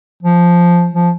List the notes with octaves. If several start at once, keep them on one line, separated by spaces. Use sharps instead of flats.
F3
F3